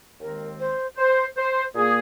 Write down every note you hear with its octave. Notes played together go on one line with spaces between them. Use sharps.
D#2 D#3 G#3 C4 A#4
C5
C5
C5
A#2 A#3 G#4